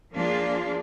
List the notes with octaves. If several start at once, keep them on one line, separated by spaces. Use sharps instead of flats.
F3 A#3 D4 F4 G#4